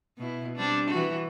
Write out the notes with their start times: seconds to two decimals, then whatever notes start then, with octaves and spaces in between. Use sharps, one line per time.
0.18 B2 E4
0.56 G3 C4 D4
0.90 E3 F#4